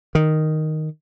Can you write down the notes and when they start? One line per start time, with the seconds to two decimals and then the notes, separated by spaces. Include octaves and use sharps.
0.15 D#3